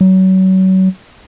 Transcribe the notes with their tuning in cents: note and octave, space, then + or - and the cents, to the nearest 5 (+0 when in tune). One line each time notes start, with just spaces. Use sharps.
F#3 +30